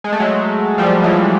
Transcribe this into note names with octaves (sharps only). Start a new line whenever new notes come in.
G#3
A3
F#3 G#3
F3 G3
E3 F#3